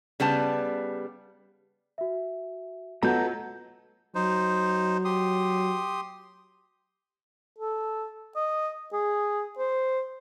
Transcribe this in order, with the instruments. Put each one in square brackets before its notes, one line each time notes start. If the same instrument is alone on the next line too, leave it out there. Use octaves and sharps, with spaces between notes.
[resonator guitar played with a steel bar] C#3 G3 B3 A5
[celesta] F#4 E5
[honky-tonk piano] F#3 [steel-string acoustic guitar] B3 A4 [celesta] F4 D#5 F#5 [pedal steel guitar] A#5 G6
[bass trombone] F#3 [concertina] D#4 C5
[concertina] G4 C6 D#6
[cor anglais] A4
D#5
G#4
C5